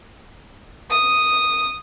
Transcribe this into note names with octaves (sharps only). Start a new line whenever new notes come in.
D#6